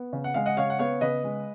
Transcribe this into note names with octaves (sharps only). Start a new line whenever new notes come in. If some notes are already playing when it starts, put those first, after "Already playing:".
Already playing: B3
C#3
F#5
G#3 F5
D#5 F#5
C#3 C#5 F5
F#5
B3 C#5 F5
C#3 B4 D#5
G#3